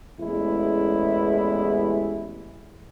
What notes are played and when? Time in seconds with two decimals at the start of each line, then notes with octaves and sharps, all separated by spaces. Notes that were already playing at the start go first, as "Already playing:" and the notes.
0.20 A1 E2 G#3 E4